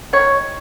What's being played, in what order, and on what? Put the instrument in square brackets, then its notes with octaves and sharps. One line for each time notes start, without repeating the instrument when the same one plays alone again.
[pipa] D#3 C#5